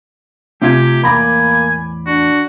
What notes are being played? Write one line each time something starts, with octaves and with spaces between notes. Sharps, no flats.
C3 A3 F4 G4 G#5 G#6
E2 A2 A#3 G#5 A#5 B5 D6
D4 F#4